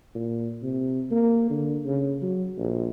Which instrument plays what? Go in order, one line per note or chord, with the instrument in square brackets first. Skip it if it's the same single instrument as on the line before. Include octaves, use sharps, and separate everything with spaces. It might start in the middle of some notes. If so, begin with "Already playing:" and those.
[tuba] A#2
C3
A#3
D3
C#3
F#3
A#1